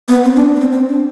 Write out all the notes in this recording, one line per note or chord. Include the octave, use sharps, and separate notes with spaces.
B3
C4
D4
B3
C4
C4
D4